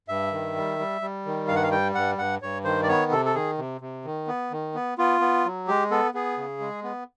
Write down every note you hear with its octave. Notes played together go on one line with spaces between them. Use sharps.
G2 E5
D#3
G3
G3
G3
D#3
G2 F5
F#5
F5
G3 G5
G2 F#5
G2 F#5
G2 C#5
D#3 C5
D5
B3 C#5
C3 A4
A4
D#3 G#4
C3
C3
D#3
B3
D#3
B3
B3 F4
B3
F#3
G#3 G4
B3 A4
B3 G#4
C#3
G#3
B3